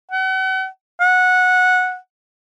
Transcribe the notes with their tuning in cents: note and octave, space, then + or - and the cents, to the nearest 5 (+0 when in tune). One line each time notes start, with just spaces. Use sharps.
F#5 +40
F#5 -15